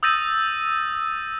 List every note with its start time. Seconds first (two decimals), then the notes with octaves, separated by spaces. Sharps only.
0.03 D#6 E6 G6 A6 A#6 D#7